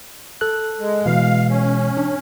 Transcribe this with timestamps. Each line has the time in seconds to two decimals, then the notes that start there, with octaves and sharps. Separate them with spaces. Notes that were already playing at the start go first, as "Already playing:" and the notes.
0.41 A4 F#6
0.79 G#3
1.06 B2 E3 G#3 F5
1.49 C#4
1.97 D4